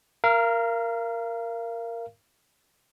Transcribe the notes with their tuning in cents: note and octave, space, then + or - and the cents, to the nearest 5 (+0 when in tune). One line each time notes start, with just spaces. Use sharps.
A#4 +0 F5 -30